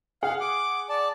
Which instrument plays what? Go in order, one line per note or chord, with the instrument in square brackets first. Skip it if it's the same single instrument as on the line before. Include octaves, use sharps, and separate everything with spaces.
[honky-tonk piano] G#4 F#5 [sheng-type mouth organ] F5
[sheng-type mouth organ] D6
D5 A5